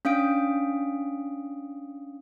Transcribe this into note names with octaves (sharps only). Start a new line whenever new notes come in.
C#4 D4 F5 D#6 D7